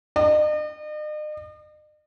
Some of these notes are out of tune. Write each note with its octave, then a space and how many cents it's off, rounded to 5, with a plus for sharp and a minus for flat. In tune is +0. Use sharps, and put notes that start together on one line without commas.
D#5 -45